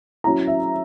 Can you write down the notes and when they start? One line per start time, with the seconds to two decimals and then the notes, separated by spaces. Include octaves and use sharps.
0.24 F#3 C#4 E4 A#5
0.48 E5